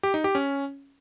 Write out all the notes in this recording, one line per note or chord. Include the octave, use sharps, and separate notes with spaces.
G4
D#4
G4
C#4